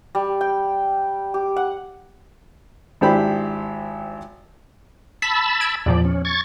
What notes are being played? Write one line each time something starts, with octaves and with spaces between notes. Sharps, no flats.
G3
G5
G4
F#5
G#1 D4 E4 G4 C5 B5
A5 B5 E6 B6
G#6 D7
E2 A#2 F3 D5
C#4
C#6 G#6 A6